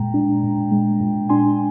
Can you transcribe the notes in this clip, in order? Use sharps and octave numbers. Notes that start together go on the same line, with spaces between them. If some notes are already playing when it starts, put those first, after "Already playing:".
Already playing: A#2 G#3 G5 A#5
D4
A#2
G#3
A#2
D4 G#5 C6